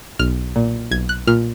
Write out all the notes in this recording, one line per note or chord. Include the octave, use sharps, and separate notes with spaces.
B1 F6
A#2
B1 G#6
F#6
A#2 F6